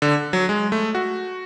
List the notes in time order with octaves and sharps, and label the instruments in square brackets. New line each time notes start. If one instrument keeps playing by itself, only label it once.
[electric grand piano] D3
F#3
G#3
A3
F#4